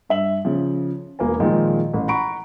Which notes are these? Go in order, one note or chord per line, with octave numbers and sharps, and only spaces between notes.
G2 E5 F#7
C#3 F3
E1 A#3 B3 G#5
A#2 D#3 F3 G#3
A1
F#5 A#5 B5 C#6 D7